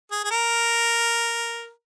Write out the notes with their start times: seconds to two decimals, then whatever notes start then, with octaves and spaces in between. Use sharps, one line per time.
0.11 G#4
0.24 G#4
0.31 A#4